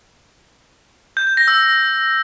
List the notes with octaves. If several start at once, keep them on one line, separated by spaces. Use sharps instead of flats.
G6
G6
A#6
E6